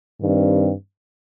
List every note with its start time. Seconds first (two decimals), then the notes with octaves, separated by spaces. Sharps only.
0.21 G2 D#3 G3 C4